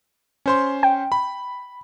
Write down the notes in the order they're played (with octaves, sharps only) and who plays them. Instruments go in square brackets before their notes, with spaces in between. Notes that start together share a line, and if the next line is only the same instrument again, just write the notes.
[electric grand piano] C#4 C5 C6
[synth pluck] G5
[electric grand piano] B5